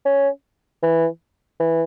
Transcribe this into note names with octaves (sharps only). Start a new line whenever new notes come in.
C#4
E3
E3